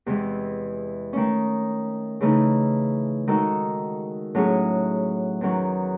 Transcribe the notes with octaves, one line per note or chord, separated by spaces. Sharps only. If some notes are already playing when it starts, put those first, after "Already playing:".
E2 C3 E3 G#3
D#3 A3 C#4
C#3 E3 A3 D#4
D#3 G#3 D#4 F#4 A4
A2 F#3 C#4 G#4
E2 D#3 F#3 C#4 F#4